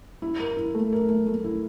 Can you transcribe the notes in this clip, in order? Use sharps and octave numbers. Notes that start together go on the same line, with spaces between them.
E4
A#4
E4
A3
A#4
A3
A3
E4